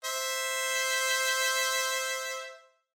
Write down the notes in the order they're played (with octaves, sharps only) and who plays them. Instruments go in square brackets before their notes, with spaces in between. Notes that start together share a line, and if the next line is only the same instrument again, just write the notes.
[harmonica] C5 E5